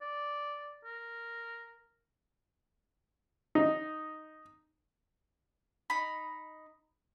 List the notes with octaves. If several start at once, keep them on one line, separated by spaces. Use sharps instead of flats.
D5
A#4
D#4
D#4 B5